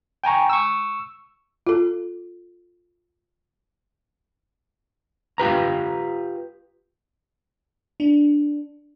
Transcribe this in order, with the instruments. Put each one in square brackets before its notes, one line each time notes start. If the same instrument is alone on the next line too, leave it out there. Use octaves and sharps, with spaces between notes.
[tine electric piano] G5 G#5 A#5 C#6
C#6 E6
[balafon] F4 A4
[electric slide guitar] F4 G4 B4 A#5
[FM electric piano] D4